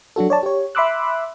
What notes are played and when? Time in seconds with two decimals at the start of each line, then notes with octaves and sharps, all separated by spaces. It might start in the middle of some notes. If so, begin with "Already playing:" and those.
0.16 F#3 D4 F#4 A4
0.30 C#5 D5 A5
0.43 G4 C#5
0.75 E5 B5 C6 D6 E6 F#6